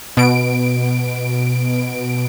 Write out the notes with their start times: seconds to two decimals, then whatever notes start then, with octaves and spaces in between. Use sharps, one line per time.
0.17 B2 D7